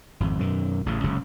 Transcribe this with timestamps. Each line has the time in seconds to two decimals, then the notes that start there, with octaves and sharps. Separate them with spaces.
0.20 G#1 F2
0.39 F#2 B2 D#3
0.86 A1 C#3
1.04 F#1 C#2 C3